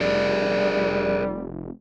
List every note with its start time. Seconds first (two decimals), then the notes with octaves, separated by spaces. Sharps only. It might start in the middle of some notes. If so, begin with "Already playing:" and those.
0.01 F1 G3 G#4 A#4 D5